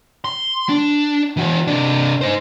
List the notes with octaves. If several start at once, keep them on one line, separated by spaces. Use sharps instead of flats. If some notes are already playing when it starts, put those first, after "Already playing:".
C6
D4
E3 F#4
C3 D4
D#4 C5